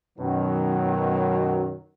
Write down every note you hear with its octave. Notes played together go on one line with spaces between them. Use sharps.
F#2 B2 D#3 F#3